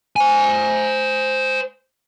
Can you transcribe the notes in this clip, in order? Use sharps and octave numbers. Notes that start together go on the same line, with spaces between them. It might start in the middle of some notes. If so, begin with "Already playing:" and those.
C5 G#5